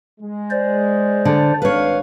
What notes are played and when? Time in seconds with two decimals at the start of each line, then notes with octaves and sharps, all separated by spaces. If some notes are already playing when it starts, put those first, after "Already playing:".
0.20 G#3
0.51 C5 D5
1.25 D3
1.62 G#1 D4 B4 C#5 F5